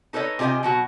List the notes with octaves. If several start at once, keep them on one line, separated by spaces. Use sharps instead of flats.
D#4 A4 B4 C#5 D#5
C3 F4 G4 D#5 G#5
B2 F#3 F#4